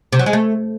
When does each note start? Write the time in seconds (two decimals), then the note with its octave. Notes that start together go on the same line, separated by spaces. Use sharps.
0.12 C3
0.19 F#3
0.26 G#3
0.33 A3